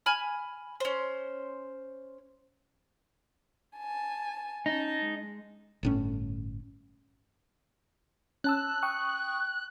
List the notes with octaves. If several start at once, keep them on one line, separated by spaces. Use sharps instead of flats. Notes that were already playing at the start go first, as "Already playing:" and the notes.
G#5 B5 F6
C#4 C5
G#5 A5
C#4 D#4 A5
G#3
G1 A2 C#4
C#4 A5 E6 F#6
G5 C#6 D#6